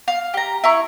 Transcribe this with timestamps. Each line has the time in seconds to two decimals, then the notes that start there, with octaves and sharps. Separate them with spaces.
0.08 F5
0.34 G4 A#5
0.64 E4 A#5 C#6